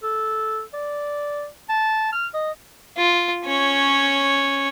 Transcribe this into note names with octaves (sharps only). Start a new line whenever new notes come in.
A4
D5
A5
F6
D#5
F4
C#4 C#5